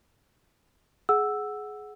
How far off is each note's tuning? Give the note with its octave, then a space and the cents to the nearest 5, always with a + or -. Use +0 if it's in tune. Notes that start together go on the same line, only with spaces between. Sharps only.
G#4 +15 F#5 +0 E6 +0